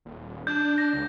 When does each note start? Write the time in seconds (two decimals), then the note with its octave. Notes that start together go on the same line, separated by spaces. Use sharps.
0.05 D#1
0.47 D4 G6
0.76 G6 A#6
0.93 C#2